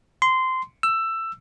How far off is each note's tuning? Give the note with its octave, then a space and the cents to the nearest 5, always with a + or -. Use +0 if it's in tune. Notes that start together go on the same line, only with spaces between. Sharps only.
C6 -15
E6 +15